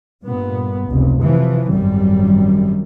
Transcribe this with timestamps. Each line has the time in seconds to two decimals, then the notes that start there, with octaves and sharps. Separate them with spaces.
0.23 G2 A#2 B3
0.88 F1 C#2
1.21 C3 E3 F3
1.70 G#1 F#2 G3